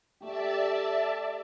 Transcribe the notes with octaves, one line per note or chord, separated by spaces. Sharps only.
A3 G4 D5 E5 A5